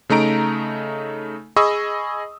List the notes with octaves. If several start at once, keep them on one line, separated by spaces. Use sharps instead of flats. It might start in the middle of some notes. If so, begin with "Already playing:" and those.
C#3 A3 D#4 A#5 D7
G#4 D#5 B5 C#6 D#6 E6